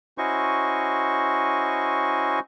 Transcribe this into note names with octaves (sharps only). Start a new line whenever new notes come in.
C#4 E4 F#4 C5 D#5 C#6